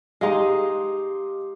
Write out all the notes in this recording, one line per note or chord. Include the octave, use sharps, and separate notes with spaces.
G#3 D#4 G4 F5 C6